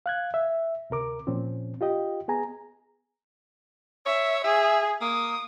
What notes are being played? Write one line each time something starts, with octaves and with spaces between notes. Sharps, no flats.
F5 F#6 G#6
E5
D2 C3 A#4 D6
A#2 F3 C4 C#4
F4 G4 D#5 G5
B3 G#4 G#5 A#5
C#5 E5
G#4 E5
A#3 D#6